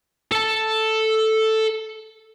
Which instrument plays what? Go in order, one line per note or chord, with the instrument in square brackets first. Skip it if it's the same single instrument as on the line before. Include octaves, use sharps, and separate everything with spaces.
[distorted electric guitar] A4 A5